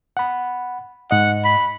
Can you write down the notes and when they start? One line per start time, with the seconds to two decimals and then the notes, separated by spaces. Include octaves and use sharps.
0.17 F#5 B5
1.11 G#2 D#5 F#5
1.44 B5